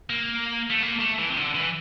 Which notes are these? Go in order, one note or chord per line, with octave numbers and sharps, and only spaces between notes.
A#3
A3
A#3
A3
E3
C3
D3
E3